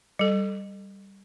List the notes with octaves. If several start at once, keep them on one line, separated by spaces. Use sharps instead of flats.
G3 A4